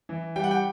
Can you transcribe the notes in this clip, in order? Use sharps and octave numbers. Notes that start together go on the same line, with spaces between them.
E3
G3 G5
F#5
G5